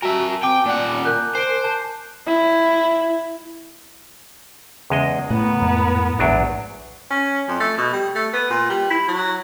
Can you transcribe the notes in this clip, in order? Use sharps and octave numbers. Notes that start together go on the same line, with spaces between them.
F#4 A#4 E5 G#5 A5
C4 G5 G#5 D6
A#2 D5 F#5
A#4 F#6 G6
C5 G#5 D7
A5 G6
E4
E2 C#3 G#3 D#5
A2 B3 A#4 F#5
F2 G#2
A#1 E2 G#2 F#3 D4
C#4
F2
A3
B2
G3
A3
B3
A#2
G3
E4
F#3